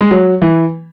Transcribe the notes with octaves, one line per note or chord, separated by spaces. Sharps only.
G#3
F#3
E3